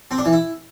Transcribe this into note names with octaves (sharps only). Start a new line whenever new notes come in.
C4
D4
E3
E4